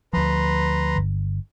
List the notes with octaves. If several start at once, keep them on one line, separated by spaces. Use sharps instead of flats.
D2 F3 B4 A#5 C6
G1